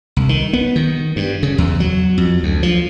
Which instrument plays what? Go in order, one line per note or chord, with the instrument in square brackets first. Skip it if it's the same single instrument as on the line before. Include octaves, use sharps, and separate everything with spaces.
[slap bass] C2
D#3
B3
D#3
G2
C#3
E2
F#3
F2
D2
F3